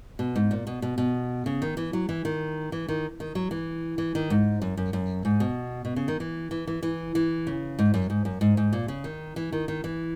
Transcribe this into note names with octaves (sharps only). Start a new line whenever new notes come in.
B2
G#2
A#2
B2
B2
B2
C#3
D#3
E3
F#3
E3
D#3
E3
D#3
D#3
F#3
E3
E3
D#3
G#2
F#2
F#2
F#2
G#2
B2
B2
C#3
D#3
E3
E3
E3
E3
E3
C#3
G#2
F#2
G#2
F#2
G#2
G#2
A#2
C#3
D#3
E3
D#3
D#3
E3